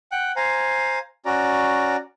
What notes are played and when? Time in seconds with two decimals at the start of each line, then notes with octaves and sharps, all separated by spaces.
0.12 F#5 G5 F#6
0.36 C5 F5 G#5 A#5
1.25 C#4 F#4 D5 A#5